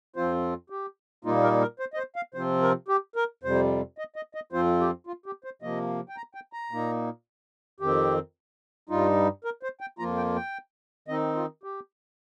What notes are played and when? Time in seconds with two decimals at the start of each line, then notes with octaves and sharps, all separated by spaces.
0.16 F2 F3 C4 F4 C5
0.70 G4
1.25 A#2 G3 A#3 D#4 F4
1.43 A#4
1.61 A#4
1.79 C5
1.94 D#5
1.97 C5
2.16 F5
2.34 C3 F3 C4 F4 C5
2.62 A#4
2.88 G4
3.16 A#4
3.43 F2 C3 G3 C5
3.98 D#5
4.16 D#5
4.35 D#5
4.52 F2 F3 C4 F4 C5
4.80 G4
5.07 F4
5.26 G4
5.44 C5
5.62 C3 F3 A#3 D#5
6.09 G5
6.17 A#5
6.34 G5
6.53 A#5
6.71 A#2 A#3 D#4
7.80 F2 D#3 C4 G4
8.89 G2 G3 D#4 F4
9.44 A#4
9.63 C5
9.80 G5
9.98 F2 F3 A#3 F4 A#5
10.17 G5
10.36 G5
11.08 D#3 C4 D#4 D#5
11.35 F4
11.63 G4